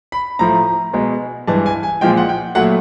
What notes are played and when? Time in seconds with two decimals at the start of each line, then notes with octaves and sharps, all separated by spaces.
0.12 B5
0.39 A2 F3 A3 A#5
0.94 B2 G#3
1.47 G2 E3 G#3 A5
1.66 G#5
1.83 G#5
2.01 A#2 F3 G#3 G5
2.17 F#5
2.29 G5
2.55 A#2 F#3 A3 F#5